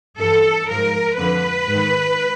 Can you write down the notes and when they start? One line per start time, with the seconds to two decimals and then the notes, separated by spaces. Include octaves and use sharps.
0.18 G2 E3 A4
0.68 G#2 F3 A#4
1.18 F2 D3 F3 B4
1.68 G#2 D#3